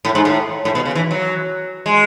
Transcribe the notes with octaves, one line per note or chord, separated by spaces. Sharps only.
A2
G#2
A2
A2
B2
C#3
E3
F#3
G#3